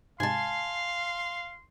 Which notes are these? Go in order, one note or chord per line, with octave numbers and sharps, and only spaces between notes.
G#2 C3 G#3 F5 G#5 A5 C6